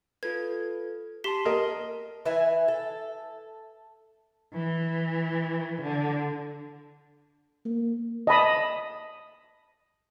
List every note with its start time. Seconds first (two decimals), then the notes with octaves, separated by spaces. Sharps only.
0.23 F4 A4 B4 G#6
1.24 G4 A5 C6 B6 C7 G7
1.45 A#4 D#5
2.25 E3 E5 G#5
2.68 A4
4.53 E3
5.81 D3
7.65 A#3
8.27 D#5 A5 B5 D#6